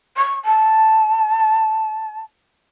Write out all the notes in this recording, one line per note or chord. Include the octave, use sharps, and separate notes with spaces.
C#6
A5